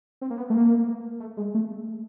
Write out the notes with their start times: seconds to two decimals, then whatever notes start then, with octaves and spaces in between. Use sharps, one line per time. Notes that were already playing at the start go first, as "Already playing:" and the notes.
0.22 C4
0.30 A#3
0.38 B3
0.50 A3
0.55 A#3
1.20 A3
1.37 G#3
1.54 A3